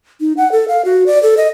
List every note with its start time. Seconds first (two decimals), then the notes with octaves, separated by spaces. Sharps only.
0.21 D#4
0.37 F#5
0.52 A4
0.68 F5
0.85 F#4
1.06 D5
1.23 A4
1.37 D#5